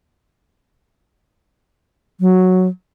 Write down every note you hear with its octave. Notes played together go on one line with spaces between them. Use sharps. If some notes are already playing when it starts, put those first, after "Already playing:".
F#3